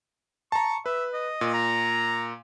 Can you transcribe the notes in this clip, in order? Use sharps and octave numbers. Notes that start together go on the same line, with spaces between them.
A5 A#5 C#6
B4 E5
D#5
A#2
A#5